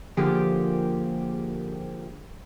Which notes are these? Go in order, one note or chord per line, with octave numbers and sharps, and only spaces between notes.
D3 F3 A#3 G4 G#4